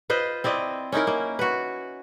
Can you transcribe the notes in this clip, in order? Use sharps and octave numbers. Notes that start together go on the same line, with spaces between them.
F4 B4 C5 D#5
C4 E4 D5 D#5
C#4 D#4 E4 A#4
A#3
F#4 B4